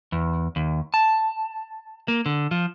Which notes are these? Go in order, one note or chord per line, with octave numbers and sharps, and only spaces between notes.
E2
D#2
A5
A#3
D3
F3